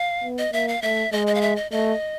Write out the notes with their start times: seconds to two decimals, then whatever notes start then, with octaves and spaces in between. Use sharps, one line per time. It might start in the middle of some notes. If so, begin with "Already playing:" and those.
Already playing: F5
0.24 B3
0.38 D#5
0.52 A#3 E5
0.68 F5
0.82 A3 E5
1.12 G#3 D#5
1.27 D#5
1.35 F5
1.41 E5
1.56 D#5
1.71 A3 D#5